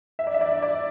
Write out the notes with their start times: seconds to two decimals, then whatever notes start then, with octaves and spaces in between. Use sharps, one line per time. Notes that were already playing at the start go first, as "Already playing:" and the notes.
0.19 E5
0.27 D5
0.34 E5
0.41 D5
0.63 D5